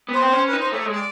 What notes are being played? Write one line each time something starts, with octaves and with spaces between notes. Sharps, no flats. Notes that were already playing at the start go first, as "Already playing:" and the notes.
B3 C5
C4
C#4
B4
D#4
C5
A3 C#5
G#3
D5